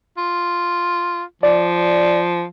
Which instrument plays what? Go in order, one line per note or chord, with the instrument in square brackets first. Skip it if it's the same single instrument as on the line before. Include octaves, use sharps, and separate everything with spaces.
[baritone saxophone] F4
[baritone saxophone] F3 [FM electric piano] D5